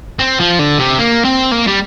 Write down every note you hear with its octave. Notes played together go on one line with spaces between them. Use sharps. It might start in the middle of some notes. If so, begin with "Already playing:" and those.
C4
F3
D3
C3
A#3
C4
A#3
G3